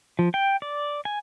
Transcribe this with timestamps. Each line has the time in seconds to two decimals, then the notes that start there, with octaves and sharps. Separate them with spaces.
0.19 F3
0.34 G5
0.62 D5
1.05 G#5